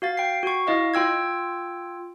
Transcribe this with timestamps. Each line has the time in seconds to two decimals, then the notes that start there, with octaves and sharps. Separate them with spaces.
0.02 F#4 F5 A6
0.17 G5 C7
0.43 F#4 C#6
0.67 E4 D#5 F5
0.94 F4 G5 E6 G#6